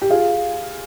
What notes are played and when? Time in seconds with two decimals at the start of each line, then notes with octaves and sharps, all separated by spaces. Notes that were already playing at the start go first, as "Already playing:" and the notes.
0.02 G4
0.10 F4 G#4